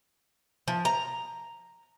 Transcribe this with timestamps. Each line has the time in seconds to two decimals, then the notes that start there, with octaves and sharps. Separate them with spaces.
0.68 F3
0.85 A#5